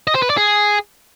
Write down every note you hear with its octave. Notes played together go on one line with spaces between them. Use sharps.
D#5
C5
B4
D5
G#4